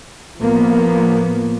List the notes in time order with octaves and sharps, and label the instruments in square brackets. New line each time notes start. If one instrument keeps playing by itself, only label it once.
[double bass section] A2 F3 A#3 B3